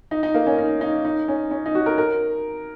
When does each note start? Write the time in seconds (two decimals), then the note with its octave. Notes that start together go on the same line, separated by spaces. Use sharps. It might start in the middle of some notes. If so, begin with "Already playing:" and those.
0.11 D#4
0.23 D#4
0.34 A#3
0.47 C#4
0.58 D#4
0.81 D#4
1.05 D#4
1.28 C#4
1.51 C#4
1.66 D#4
1.75 F#4
1.86 A#4
1.98 A#4